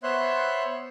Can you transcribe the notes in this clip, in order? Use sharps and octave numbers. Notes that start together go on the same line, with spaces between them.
B3 C5 C#5 E5 C6 F#6